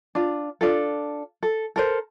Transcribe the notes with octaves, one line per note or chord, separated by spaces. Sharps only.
D4 F4
D4 F4 A4
A4
A4 A#4 C5